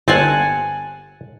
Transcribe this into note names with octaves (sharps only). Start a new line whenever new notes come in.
G1 C4 F#5 G#5 A5